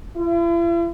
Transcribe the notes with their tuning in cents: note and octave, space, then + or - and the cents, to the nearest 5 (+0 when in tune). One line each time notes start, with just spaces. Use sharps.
E4 +45